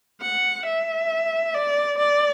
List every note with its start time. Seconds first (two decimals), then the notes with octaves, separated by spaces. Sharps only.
0.22 F#5
0.66 E5
1.54 D5
1.98 D5